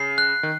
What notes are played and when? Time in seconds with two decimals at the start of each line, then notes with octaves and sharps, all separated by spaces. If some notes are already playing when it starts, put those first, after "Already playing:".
Already playing: C#3 C7
0.18 F#6
0.43 D#3